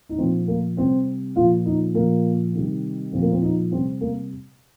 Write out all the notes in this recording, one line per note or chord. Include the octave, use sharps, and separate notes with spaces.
D#4
A#2 F3 C4
A#3
C3 G3 C4
A#2 F3 F4
D#4
A#2 F3 A#3
C3 D#3 G3
A#2 F3 C4
A#3
C4
D#4
C3 G3 C4
A#3